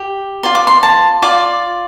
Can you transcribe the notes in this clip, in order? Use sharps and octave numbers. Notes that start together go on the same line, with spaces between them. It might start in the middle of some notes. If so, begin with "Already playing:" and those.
Already playing: G4
F4 D5 C6
D6
C6
A5
F4 D5 D6